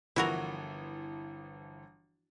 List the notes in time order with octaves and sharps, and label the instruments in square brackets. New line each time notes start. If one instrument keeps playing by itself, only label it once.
[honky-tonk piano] G1 E3 F3 [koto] E4 F#4 A#4